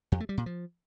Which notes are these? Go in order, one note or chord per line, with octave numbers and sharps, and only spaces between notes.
F2
A3
G3
A#2
F3